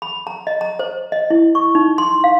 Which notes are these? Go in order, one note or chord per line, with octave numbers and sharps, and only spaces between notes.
B5
A#5
D#5
A#5
C5
D#5
E4
C#6
D#4
C6
F5